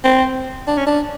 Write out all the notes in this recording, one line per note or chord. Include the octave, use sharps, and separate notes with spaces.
C4
D4
C#4
D4